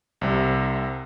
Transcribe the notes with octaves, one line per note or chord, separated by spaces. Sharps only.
C2 C3